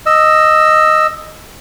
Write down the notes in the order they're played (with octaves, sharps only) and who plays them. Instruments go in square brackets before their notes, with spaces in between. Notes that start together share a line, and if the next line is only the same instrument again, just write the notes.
[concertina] D#5 E6